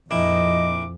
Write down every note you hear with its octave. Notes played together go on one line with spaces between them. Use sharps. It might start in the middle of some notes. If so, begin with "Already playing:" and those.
A#1 F2 E4 D#5 D6